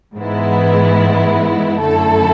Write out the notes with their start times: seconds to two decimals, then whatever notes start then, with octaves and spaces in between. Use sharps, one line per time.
0.16 G#2 E3 G#3 B3 E4
1.79 F#2 D3 A3 E4 A4